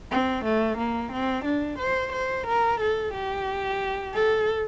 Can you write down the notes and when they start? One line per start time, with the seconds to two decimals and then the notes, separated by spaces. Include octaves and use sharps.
0.11 C4
0.44 A3
0.78 A#3
1.12 C4
1.45 D4
1.79 C5
2.13 C5
2.47 A#4
2.81 A4
3.14 G4
4.14 A4